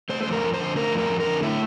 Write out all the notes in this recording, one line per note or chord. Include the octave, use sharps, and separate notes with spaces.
A3 C5
F2 C5
A#4
F2
C5
D3
A3 A#4
F2
A#4
F2
A#4
D3
A3 E4